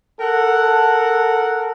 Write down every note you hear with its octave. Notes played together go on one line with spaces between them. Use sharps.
A4 A#4 F#5